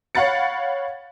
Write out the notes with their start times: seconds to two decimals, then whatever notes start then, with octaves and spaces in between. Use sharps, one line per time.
0.15 C#5 F5 F#5 B5 A6 C#7